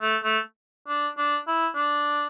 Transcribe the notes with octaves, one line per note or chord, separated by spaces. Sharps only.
A3
A3
D4
D4
E4
D4